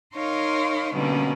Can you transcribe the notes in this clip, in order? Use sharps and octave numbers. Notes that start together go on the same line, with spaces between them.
D#4 A#4 C#5 F5 C6
B2 D3 G3 A#3 C#4